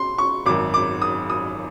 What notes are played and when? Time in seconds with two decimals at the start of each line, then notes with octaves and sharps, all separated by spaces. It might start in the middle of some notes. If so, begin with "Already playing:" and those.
Already playing: C6
0.18 C#6
0.46 G#1 F#2 D#3 D6
0.74 D6
1.02 D#6
1.30 D#6